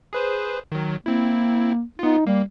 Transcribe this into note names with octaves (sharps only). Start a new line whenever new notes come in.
G#4 B4 C5
D#3 F#3
A#3 C4 E4
B3 D#4 F4
G3 A#3